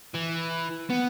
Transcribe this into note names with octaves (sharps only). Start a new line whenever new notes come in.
E3
B3